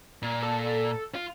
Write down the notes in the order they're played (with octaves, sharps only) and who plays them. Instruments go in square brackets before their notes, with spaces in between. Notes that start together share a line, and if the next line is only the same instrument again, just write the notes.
[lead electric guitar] A#2
[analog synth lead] A4
[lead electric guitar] F4